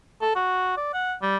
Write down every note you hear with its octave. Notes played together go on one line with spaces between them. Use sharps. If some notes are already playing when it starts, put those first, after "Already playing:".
A4
F#4
D5
F#5
G3